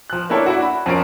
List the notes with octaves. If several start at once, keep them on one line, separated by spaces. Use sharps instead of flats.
F3 F#6
A#3 D4 E4 A4 C#5
D4 E4 F#4
B5
F2 F3 C#4 A#4 C7 D7